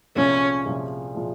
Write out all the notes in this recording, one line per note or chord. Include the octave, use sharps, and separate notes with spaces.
C2 A#2 F3 G#3 C#4
C2 A#2 F3 G#3
A#2 F3 G#3